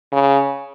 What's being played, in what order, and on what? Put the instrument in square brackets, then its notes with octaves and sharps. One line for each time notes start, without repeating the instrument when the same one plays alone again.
[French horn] C#3